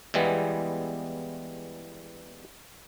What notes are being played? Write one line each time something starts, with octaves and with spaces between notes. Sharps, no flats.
E2 E3 G3 G#3 B3